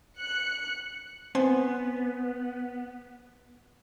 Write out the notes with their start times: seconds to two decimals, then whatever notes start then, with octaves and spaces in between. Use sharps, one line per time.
0.18 F#6 C#7
1.35 B3 C4 C5 G#5